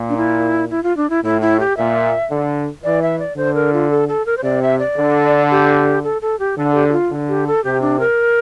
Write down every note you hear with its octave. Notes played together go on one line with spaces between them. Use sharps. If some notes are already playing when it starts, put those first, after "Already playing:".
Already playing: A#2
D4
E4
E4
F4
D4
E4
A2 E4
E4
G4
A#2 E5
D3
E3 D5
E5
D5
D3 C5
A#4
F4
A4
A4
A#4
C5
C3 D5
E5
D5
D3
G4
A4
A4
G4
D3 A4
G4
G4
F4
D3
G4
A4
C3 G4
D4
A#4